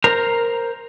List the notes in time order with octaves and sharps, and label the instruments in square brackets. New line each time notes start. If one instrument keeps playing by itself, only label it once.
[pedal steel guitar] A#4 C5 A#5